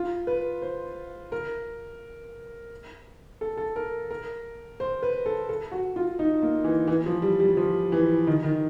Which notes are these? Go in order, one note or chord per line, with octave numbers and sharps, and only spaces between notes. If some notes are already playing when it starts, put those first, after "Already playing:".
Already playing: F4
B4
C5
A#4
A4
A4
A#4
A#4
C5
B4
A4
A4
F#4
F4
D#4
A#3
E3
E3
F3
G3
G3
F3
E3
D#3
D#3